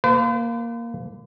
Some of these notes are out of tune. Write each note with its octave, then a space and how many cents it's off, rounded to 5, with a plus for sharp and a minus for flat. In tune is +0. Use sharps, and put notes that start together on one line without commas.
A#3 +0 B4 +45